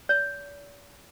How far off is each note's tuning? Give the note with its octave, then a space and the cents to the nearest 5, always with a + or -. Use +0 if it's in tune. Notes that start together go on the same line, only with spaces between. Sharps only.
D5 -45